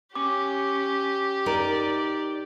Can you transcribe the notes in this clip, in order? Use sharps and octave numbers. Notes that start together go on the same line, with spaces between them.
C#4 G4 D6
D#4 A#4 D5